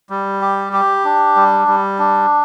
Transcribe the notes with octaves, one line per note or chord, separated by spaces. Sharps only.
G3
G4
G4
D4
G3
G3
D4